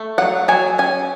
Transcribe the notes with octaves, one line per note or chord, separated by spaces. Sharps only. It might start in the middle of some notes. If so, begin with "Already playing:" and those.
Already playing: A3
F#3 F#5
F#3 G#5
C#4 G#5